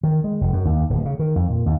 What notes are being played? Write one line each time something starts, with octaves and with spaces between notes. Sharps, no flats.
D#3
G#3
F1
F#2
D#2
D1
C#3
D#3
F2
A#2
D#2